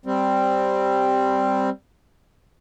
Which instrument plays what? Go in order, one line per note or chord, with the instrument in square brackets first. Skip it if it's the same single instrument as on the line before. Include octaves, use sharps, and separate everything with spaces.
[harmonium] G3 C4